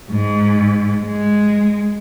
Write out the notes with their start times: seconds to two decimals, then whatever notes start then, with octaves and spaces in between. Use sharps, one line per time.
0.11 G#2
1.05 G#3